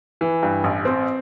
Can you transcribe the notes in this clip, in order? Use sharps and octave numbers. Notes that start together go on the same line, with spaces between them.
E3
G2
A1
C4